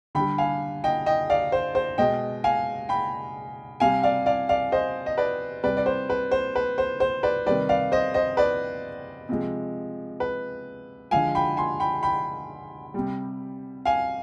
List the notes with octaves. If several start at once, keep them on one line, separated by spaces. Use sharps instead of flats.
D3 G3 G5 B5
F5 G#5
D#5 G5
D#5 G5
D5 F5
C5
C5
B2 G#3 D#5 G5
F5 G#5
G5 B5
C3 G3 F5 G#5
D5 F5
D5 F5
D5 F5
C5 D#5
D#5
B4 D5
C3 G3 B4 D5
D5
C5
B4
C5
B4
C5
C5
B4 D5
C3 D#3 G3 B4 D5
D5 F5
C5 D#5
C5 D#5
B4 D5
C3 F3 G#3
B4
D3 F3 G#3 F5 G#5
G5 B5
G#5 C6
G5 B5
G5 B5
C3 G3
F5 G#5